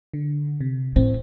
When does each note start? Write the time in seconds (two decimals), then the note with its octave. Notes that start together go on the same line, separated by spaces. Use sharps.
0.14 D3
0.61 C3
0.96 A2 C4